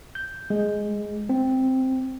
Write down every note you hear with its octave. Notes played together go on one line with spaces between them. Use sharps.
G6
G#3
C4